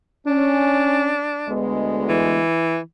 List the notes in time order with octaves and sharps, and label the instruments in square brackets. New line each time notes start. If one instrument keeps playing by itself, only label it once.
[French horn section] C#4 [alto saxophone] D4
[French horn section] D2 G#3 B3
[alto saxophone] E3